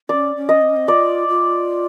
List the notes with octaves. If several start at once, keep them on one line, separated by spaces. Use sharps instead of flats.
C#4 D5
C#4
D#5
C4
C#4
C4
F4 D5
F4